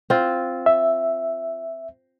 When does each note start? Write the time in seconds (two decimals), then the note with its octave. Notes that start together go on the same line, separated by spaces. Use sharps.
0.10 C4 F4
0.66 E5